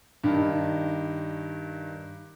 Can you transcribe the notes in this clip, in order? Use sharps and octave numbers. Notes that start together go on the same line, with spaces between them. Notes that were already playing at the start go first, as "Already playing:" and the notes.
G2 D#3